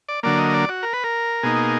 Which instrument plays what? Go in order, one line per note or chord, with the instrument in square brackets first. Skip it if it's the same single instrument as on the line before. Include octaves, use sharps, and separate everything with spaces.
[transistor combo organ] D5
D3 F#3 A#3 D5
D#5
D5
F#4
A#4
B4
A#4
B2 A#3 D#4 G#4